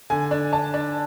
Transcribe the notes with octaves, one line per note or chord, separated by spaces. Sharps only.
D3 G#5
D4
D4 A5
D4